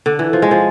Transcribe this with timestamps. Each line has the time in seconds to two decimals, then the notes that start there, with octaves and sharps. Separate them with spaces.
0.06 D3
0.19 E3
0.33 F3
0.42 G#3
0.51 F3